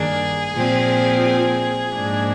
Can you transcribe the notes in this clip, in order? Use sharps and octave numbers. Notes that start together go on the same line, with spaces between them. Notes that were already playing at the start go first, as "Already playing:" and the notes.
Already playing: G2 D#3 A#3 D4 G#4
A#2 F3 C4
G#4
G#2 F3 A#3 D4